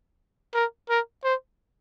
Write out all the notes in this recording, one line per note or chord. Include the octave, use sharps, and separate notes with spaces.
A#4
A#4
C5